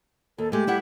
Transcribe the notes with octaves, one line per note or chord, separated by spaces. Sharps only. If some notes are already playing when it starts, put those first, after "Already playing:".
D#2 A4
G#3 A3 G4
G3 E4 F#5